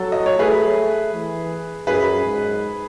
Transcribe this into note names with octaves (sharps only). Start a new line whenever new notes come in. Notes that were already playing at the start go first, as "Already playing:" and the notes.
Already playing: F#3 A4
D#5
C#5
A3 G#4 B4
E3
F#2 G#4 B4
G#2